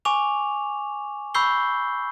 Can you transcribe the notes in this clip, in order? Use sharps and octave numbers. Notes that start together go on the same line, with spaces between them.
G#5 C#6 D6 F7
B5 C#6 E6 G6 C7 G7